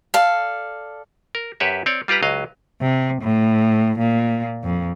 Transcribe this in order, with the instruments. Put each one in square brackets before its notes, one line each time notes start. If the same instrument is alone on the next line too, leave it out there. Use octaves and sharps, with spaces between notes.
[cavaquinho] A4 D5 F5
[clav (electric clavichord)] A#4
F#2 G4 B4 C#5 E5
C4 C#5 D5
G3 F4 G4 B4 A#5
C#2 F#3 D#5 F5
[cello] C3
A2
A#2
F2